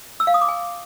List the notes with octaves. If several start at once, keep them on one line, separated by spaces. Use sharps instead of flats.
E6
F5
D#6
D6
G#5